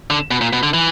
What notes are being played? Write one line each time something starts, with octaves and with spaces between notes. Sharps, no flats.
D3
B2
A#2
B2
D3
E3